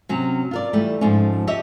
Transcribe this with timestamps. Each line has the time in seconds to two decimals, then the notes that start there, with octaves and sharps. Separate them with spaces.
0.09 C3 F#3 C#4
0.51 F4 A#4 D5
0.73 E3 G3 A3
1.01 G#2 F3 A3 C#4
1.47 G4 C#5 D#5 E5